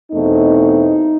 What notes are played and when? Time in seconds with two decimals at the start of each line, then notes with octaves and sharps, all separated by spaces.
0.12 E2 B2 A3 C4 D#4